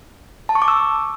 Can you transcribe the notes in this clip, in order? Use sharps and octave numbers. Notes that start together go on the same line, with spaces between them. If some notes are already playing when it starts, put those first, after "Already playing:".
A5
C#6
D6
E6